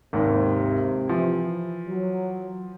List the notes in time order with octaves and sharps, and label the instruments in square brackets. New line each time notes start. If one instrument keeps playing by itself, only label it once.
[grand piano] G#1 D#2 G#2 [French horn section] C3
[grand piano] E3 F3 E4
[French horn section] F#3